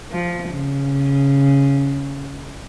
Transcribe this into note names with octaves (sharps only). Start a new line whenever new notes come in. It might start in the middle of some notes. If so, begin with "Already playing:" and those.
F3
C#3